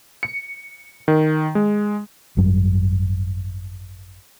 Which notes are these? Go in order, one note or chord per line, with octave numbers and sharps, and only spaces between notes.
C#7
D#3
G#3
G#1 F#2 F#3 G3